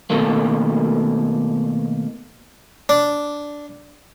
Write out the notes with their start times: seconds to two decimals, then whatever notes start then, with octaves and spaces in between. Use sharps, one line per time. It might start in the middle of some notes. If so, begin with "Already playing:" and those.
0.10 B2 D#3 A3 A#3
2.89 D4